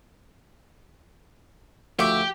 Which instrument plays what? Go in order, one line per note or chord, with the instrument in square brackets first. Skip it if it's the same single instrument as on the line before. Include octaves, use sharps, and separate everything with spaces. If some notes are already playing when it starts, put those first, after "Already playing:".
[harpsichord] D2 F3 F#4 [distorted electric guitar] G4 [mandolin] E5 D6